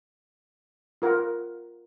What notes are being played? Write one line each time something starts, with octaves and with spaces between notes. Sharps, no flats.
F4 A#4 F#5